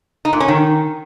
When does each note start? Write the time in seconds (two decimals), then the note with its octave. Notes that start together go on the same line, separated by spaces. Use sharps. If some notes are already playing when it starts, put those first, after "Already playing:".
0.25 D#4
0.33 A#2
0.40 C#4
0.48 D#3